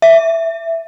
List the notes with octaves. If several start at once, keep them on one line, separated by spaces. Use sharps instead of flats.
E5